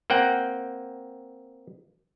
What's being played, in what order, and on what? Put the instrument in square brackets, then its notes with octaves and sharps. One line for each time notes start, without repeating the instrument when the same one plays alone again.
[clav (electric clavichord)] A#3 C4 F#5 G5